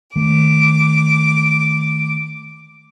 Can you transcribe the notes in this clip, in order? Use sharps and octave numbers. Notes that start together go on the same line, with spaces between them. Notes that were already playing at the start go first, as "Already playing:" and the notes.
D#3 A3 D6